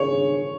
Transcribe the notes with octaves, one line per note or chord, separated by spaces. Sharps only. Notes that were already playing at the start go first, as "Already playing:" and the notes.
Already playing: C#3 C#5